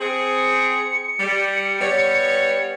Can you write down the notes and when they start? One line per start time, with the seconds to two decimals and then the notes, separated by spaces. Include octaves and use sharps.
0.01 C4 G#4 C#7
1.20 G3
1.81 G3 B3 C#5